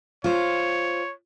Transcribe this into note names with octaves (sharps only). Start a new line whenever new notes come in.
F4 C5 C#5